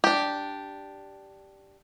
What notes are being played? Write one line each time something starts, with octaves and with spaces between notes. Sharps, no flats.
D4 G4